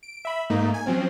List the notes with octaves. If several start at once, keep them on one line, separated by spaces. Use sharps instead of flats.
D7
E5 B5
G#2 A3 A#3 D#4
G#5
F3 F#3 C4 C#4